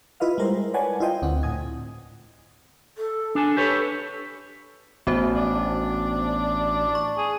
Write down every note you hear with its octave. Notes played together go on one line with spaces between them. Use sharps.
E4 F4 B4 D#5 F5
G3 G#3 A#4 C5
B4 C#5 D5 F#5 G#5 A5
E4 F4 C5 D#5 G5
D2 C4 F#5
A2 G#5 D#6 G#6
A4
D4 A4 G#5
G4 A4 B4 C#5
A1 B3 F#4 C5
D4
C#6
G#4